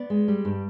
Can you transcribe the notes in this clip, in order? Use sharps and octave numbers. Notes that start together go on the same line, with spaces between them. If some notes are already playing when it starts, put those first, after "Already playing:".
Already playing: B3 D5
G#3
G3
G2